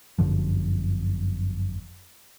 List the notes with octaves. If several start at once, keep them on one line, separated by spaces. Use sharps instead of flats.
G1 F#2 D3 F3